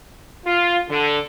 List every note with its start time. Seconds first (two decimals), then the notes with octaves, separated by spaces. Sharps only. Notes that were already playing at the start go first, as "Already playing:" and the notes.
0.46 F4
0.90 D3